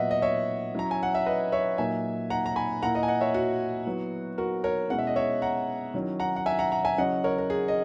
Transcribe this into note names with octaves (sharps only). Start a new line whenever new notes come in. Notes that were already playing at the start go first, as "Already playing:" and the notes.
Already playing: A#2 F#3 B3 D#5 E5 F#5
D#5
C#5 E5
F#3 C#4 E4 A#5
G#5
F#5
E5
B4 D#5
C#5 E5
A#2 F#3 A#3 D#4 E5 G#5
F#5 A#5
A#5
G#5 B5
A#2 A#3 E4 F#5 A#5
D#5 F#5
G#5
D#5 F#5
C#5 E5
F#4
F#3 B3 E4
F#4 A#4
A#4 C#5
B2 G#3 C#4 E4 F#5
E5
D#5
C#5 E5
F#5 A#5
D#3 F#3 C#4 E4
F#5 A#5
F#5
E5 G#5
F#5 A#5
F#5 A#5
E5 G#5
C#3 F#3 C#4 E4 D#5 F#5
A#4 C#5
A#4
G#4
D#5